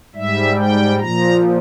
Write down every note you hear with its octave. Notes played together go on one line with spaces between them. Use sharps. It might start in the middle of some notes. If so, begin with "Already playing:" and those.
G#2 G3 E5
G5
A#2 F3 A#5